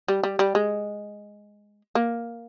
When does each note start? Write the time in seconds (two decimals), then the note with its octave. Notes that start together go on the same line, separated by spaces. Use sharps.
0.08 G3
0.23 G3
0.39 G3
0.55 G#3
1.95 A#3